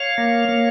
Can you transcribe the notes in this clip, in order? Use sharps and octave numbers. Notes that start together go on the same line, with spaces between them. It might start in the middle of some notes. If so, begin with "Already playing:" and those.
Already playing: C#5 F5
A#3
A#3